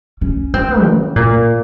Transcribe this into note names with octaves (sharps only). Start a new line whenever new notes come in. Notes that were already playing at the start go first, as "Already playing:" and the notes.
C#4
C4
C#3
A#2